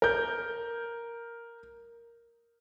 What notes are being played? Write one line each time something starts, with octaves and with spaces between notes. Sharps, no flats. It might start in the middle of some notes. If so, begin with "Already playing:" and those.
A#4 G6